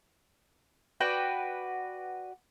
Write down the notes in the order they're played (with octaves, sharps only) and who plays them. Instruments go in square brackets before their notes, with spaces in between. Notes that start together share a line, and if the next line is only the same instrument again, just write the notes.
[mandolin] F#4 B4 D5 G5